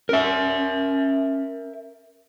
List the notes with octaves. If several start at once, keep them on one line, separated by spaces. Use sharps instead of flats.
C#4 A#4 E5